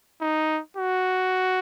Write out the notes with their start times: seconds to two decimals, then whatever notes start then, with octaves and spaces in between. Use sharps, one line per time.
0.22 D#4
0.77 F#4